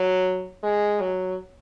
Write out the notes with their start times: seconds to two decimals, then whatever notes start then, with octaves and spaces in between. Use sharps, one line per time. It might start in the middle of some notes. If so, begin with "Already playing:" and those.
Already playing: F#3
0.63 G#3
1.01 F#3